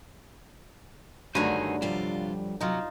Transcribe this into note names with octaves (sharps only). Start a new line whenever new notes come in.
G2 D3 D#3 F#3 A3 C#4 C5 G#5
C3 F3 G3 D4 F4
C3 F#3 D#4 F4